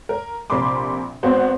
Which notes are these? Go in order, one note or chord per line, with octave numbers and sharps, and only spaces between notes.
A#4
A#1 C3 A#4 B5 C6 D6
G#1 B3 C4 F#4 C5